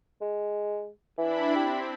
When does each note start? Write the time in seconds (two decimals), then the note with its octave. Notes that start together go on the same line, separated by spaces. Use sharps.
0.21 G#3
1.18 E3 D4 E4 B5
1.56 C4 G4